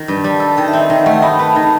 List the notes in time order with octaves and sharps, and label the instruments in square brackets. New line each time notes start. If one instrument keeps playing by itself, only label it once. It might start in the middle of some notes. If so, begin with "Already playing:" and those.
Already playing: [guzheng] D#3
G2
[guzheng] G3 [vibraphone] A5
[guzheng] A4
[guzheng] D#3 [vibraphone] G5
[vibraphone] E5
[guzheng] C4
[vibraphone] D#5
[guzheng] D#3 [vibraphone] E5
[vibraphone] F#5
[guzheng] A3
[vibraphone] G5
[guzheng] D#4 [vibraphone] B5
[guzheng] B4 [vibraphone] A5
[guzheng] D#3 [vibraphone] A5